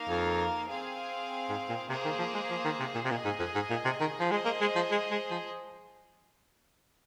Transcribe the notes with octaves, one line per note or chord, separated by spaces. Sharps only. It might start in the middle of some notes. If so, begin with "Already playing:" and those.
Already playing: A#3 D#4 A#4 F5
F2
C4 G#4 F5 G#5
G#2
A#2
C3 A#3 G#4 C5
D#3
F3
G#3
F3
D#3
C3
A#2
C3
A#2 G#4 D#5 G#5
G#2
F2
G#2
A#2
C3
D#3
F3
G#3 G#4 C5 D#5 G#5
A#3
G#3
F3
G#3
G#3
F3